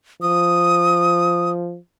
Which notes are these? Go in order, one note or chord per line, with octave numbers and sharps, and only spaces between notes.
F3 D#6